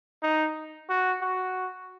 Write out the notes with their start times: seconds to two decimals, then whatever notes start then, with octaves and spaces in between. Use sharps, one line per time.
0.23 D#4
0.89 F#4
1.22 F#4